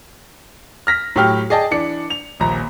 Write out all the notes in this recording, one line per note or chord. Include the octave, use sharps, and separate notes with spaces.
F6 A#6 B6
A2 F#3 G4 G5 F6
G#4 D5 D#5 G5 A5
E3 D4 C#7
F7
D#1 A#1 A#5